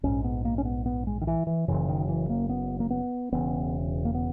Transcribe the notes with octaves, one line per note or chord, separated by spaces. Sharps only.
A#1 G#2 C#4
B3
A#3
C#4
B3
B3
G#3
D#3
E3
E3
F#1 F#2 C#3 E3
D#3
E3
A#3
B3
A#3
B3
E1 E2 C#3 B3
A#3
B3